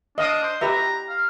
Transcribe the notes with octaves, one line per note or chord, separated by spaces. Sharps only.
D4 D#5 F5 D#6
C5
G4 B4 E5 A#5
F5